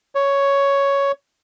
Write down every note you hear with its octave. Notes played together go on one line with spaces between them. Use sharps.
C#5